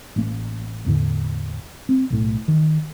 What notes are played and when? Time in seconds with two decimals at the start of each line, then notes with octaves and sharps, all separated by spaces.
0.16 A1 A#3
0.86 E2 A2 D3
1.89 C4
2.10 B1 A2
2.48 D#3